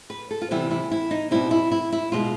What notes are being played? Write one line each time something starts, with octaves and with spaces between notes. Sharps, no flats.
B4
A4
F4
C3 E3 G3 B3 E4
E4
E4
D#4
B2 G3 C4 E4
E4
E4
E4
B2 G#3 F4